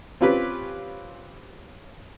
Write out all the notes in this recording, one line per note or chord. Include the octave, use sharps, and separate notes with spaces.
C4 C#4 F4 G4 B4